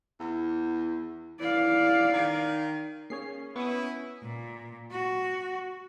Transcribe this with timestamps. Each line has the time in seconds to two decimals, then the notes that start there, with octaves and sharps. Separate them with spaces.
0.20 E2
1.40 E3 D5 F5
2.13 D#3
3.10 A#3 C#4 G#4 C#5 C7
3.56 B3 E4 C#6 D#6
4.23 A#2
4.91 F#4